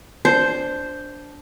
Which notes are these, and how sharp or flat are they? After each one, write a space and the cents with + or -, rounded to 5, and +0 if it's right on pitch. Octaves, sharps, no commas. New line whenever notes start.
D4 -10 C5 +0